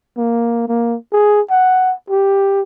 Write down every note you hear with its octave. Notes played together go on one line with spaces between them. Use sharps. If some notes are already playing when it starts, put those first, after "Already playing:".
A#3
A#3
G#4
F#5
G4